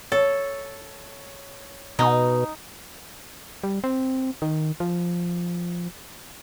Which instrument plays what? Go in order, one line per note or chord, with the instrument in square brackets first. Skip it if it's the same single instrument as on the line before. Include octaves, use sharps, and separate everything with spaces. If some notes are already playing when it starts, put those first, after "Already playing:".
[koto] A4 [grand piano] C#5
[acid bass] B2 [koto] D#4
[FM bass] G3
C4
D#3
F3